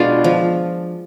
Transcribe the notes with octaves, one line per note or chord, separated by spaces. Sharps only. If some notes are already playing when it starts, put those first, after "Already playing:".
Already playing: B2 G#3 D4 F4
F3